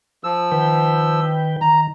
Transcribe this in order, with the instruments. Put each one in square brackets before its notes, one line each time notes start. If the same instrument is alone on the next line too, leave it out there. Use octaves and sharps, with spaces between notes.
[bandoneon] F3 E6
[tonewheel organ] D#3 B4 G5
[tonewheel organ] D#3 [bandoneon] A#5